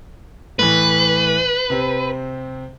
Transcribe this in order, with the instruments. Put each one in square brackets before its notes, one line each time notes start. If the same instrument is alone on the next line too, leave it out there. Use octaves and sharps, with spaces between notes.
[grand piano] A2 E3 [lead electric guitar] B4
[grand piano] C3 C4